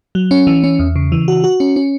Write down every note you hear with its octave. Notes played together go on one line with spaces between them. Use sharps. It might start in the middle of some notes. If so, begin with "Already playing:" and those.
F#3
C#4
E3
C#4
E2
C#3
E3
F#4
F#4
C#4
C#4